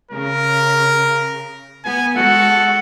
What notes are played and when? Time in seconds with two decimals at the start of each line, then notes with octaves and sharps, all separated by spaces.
0.11 C#3 A#4
1.85 B3 G#5
2.16 G#3 F#4 A4 F#5